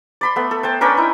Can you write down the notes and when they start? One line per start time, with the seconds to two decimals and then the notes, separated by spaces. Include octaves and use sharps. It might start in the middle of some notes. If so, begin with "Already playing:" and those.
0.21 D5 B5 C6
0.36 A3 B3
0.51 A4
0.63 C5 G5 A5
0.81 C#4 D4 A#4 B4
0.97 D#4 E4